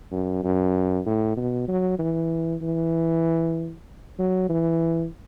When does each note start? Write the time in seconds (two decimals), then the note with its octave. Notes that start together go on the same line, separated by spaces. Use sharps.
0.12 F#2
0.44 F#2
1.06 A2
1.37 B2
1.68 F#3
1.99 E3
2.62 E3
4.19 F#3
4.49 E3